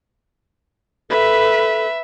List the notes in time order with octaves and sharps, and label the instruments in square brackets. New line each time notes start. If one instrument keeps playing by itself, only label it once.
[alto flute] A4 [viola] B4 [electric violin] E5